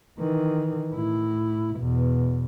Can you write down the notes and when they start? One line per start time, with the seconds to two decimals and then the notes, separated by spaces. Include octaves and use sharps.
0.19 D#3 E3
0.92 A2 E4
1.76 E2 B2